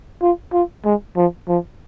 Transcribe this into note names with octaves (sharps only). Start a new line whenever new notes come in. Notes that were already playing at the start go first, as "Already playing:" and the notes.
F4
F4
G#3
F3
F3